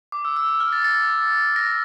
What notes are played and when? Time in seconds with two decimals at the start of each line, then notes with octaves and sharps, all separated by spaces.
0.12 D6
0.25 E6
0.36 E6
0.49 E6
0.60 F6
0.73 A6
0.84 A6
1.56 A#6